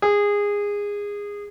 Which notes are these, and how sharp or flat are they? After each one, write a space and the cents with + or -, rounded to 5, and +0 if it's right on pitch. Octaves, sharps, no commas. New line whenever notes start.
G#4 -20